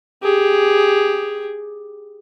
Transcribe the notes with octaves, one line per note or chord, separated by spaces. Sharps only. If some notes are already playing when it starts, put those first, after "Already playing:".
G4 G#4